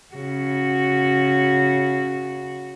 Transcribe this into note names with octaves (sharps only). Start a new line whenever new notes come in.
C#3 F#4